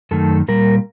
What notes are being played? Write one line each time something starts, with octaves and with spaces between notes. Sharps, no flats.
F#2 D#3 A3 A4
A#2 G3 A#4